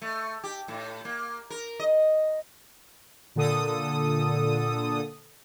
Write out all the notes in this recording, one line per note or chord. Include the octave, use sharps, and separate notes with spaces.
A3
G4
A2
A#3
A#4
D#5
A#2 D3 A4 D#6